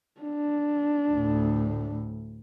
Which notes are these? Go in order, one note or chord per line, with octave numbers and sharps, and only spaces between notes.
D4
D2 A2